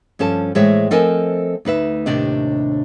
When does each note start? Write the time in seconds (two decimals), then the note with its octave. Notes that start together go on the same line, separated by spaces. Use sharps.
0.19 G2 F3 C#4 A4 A5
0.55 A2 E3 G#3 C5 C#5 E5
0.91 F3 C4 A4 A#4 D#5 G#5
1.65 D2 D#4 B4 E5
2.06 D#2 A2 C3 D4 G4 D#5